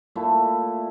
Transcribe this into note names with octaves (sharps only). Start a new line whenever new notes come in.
A#2 A3 E4